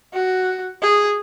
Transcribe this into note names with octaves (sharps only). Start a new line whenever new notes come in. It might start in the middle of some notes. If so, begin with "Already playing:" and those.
F#4
G#4